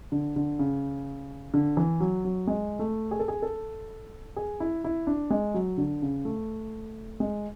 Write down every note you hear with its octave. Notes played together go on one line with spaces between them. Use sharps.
D3
D3
C#3
D3
E3
F#3
F#3
G#3
A3
G#4
A4
G#4
A4
G#4
E4
E4
D4
G#3
F#3
D3
C#3
A3
G#3